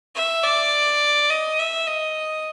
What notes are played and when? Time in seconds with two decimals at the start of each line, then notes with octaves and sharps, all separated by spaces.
0.15 E5
0.44 D5
1.30 D#5
1.59 E5
1.87 D#5